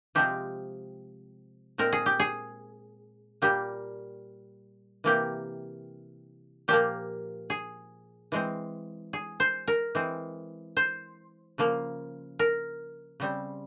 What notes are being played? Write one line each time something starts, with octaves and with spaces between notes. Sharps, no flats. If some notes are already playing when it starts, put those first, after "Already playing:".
C3 F3 G#3 C4 G4
A#2 G#3 C4 A#4
G#4
G4
G#4
A#2 G3 A#3 G4
C3 E3 A#3 G4
A#2 F3 A#3 G4
G#4
E3 G#3 C4
G#4
C5
A#4
E3 G#3 C4
C5
C#3 F3 A#3
A#4
C#3 G3 C4